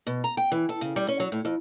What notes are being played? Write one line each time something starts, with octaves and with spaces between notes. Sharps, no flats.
B2
A#5
G5
E3
A4
C#3
G3
C#4
F#3
A2
F2